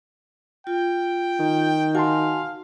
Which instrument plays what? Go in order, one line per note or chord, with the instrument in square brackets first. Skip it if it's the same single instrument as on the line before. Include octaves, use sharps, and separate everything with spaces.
[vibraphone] F4 [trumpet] G5
[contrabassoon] D#3
[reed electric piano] F#4 A5 C6 [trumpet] F5 [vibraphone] G#5